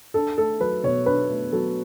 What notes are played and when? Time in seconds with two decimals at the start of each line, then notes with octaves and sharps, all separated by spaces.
0.14 D4 A4
0.37 A3 A4
0.61 F#3 B4
0.84 B2 C#5
1.06 D4 B4
1.29 A3
1.52 F#3 A4